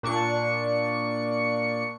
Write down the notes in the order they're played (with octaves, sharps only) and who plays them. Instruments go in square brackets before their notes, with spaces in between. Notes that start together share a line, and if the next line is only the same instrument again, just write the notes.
[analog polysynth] A#2 D4 C#6 C#7